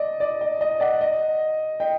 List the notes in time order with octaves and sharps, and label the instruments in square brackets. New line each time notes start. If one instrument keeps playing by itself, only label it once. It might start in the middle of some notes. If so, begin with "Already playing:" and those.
Already playing: [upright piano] D5 D#5
D5
D#5
D#5
D5 F#5
D#5
D#5 G5